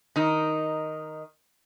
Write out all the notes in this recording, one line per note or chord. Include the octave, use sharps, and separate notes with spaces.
D#3 D#4